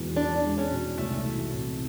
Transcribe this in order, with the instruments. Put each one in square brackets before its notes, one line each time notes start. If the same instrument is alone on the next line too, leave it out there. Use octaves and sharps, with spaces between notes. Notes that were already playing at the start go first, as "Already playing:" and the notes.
Already playing: [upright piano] E2 B2 G#3
[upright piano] E2 [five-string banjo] D4
[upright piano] G#3
[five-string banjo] C#4
[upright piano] B2
[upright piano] C2 [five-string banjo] A3
[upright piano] E3
C3